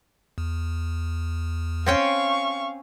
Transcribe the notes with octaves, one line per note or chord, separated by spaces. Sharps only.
E2
C4 C#4 F5 G5 C#6